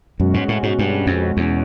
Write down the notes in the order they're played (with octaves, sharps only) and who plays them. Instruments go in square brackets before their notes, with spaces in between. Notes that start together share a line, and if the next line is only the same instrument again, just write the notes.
[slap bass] F#2 [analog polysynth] B2 G#3 C#4 F#4
[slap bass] G#2
A2
G#2
G2
F2
E2